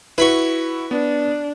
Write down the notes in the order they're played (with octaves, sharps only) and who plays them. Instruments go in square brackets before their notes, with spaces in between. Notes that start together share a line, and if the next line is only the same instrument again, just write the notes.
[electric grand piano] E4 F#4 [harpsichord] B4 B5 C#6
[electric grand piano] B3 [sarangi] D4